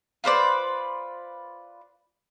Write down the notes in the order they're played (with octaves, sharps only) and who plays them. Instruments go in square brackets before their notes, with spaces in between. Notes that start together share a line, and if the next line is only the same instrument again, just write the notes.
[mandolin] F4 B4 C5 D5